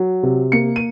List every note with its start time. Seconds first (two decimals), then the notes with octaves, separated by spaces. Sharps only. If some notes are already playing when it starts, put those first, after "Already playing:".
Already playing: F#3
0.23 C3
0.52 A#3 C#7
0.76 D#7